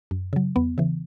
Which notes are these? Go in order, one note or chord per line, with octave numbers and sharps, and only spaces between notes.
F#2
C#3 F#3
E2 B3
C#3 E3